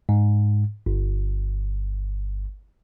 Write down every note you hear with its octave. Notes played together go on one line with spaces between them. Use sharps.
G#2
G1